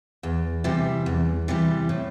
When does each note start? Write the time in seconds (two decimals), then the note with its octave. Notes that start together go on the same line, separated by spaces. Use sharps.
0.23 E2
0.64 C3 E3 G3
1.06 E2
1.48 C3 E3 G3
1.89 A2